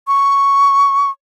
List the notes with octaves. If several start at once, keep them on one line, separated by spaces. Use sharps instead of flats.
C#6